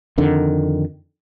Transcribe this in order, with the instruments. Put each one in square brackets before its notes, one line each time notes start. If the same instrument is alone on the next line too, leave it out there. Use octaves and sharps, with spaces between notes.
[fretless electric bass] F2 D3 D#3